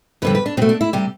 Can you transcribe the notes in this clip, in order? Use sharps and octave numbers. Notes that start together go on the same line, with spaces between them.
F2 D3 G3 B4
B4
D4
B2 A3 C4
D4
E4
C3 G3 G4